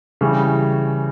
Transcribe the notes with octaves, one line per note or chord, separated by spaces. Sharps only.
C#3 E3 G3